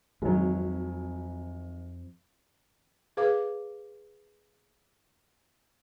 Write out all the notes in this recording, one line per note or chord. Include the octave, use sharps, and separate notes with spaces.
G#1 F2 F#3
G#4 B4 F5 D6